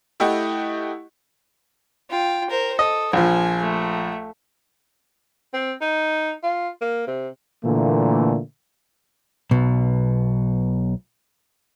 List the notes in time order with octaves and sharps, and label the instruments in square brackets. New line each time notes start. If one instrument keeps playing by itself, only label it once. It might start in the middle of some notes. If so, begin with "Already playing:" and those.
[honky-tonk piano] A3 E4 G4 D#5 F#5
[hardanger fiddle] F4 G5
A#4 C5
[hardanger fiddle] A4 [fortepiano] D#5
[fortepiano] A#1 F3 [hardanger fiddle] G#5
[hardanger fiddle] A3
[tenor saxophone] C4
D#4
F4
A#3
C3
[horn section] A#2 D3 E3 A3 A#3
[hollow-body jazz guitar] B1 B2